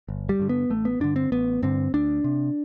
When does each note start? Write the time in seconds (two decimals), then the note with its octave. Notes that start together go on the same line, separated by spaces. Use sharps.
0.08 G1
0.29 G3
0.39 G2 D3
0.49 B3
0.70 A1 A3
0.85 B3
1.00 G2 D3 D4
1.16 C4
1.32 A1 B3
1.62 G2 D3 C4
1.94 D2 D4
2.24 C3